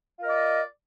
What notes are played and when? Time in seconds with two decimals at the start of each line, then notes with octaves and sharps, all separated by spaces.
0.18 F4
0.22 A#4
0.25 D#5
0.29 D5